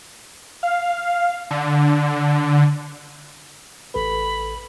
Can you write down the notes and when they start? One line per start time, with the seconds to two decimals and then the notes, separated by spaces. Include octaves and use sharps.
0.63 F5
1.51 D3
3.94 A1 A4 B4 B5